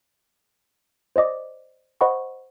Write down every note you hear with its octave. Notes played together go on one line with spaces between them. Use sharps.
C5 D5 D#5 D6
C5 D#5 F#5 B5 C#6